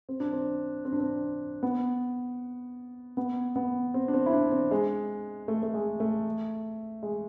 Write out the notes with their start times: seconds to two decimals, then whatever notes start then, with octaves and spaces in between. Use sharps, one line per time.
0.09 C4
0.20 D4
0.33 C4
0.85 C4
0.93 D4
1.00 C4
1.63 B3
3.17 B3
3.56 B3
3.94 C4
4.08 D4
4.14 C4
4.26 E4
4.33 D4
4.51 C4
4.71 G#3
5.48 A3
5.63 A3
5.74 G#3
6.00 A3
7.03 G#3